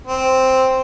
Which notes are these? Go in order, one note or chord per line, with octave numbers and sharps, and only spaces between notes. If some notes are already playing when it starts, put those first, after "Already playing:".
C4